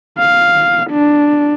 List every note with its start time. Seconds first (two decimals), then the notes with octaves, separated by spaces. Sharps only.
0.18 F5
0.91 D4